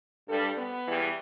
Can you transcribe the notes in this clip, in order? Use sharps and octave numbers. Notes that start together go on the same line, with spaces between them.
G2 G3 A4
B3
E2 E3 G3